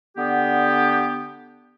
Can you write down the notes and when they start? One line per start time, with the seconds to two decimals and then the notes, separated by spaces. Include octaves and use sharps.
0.17 D3 B3 G4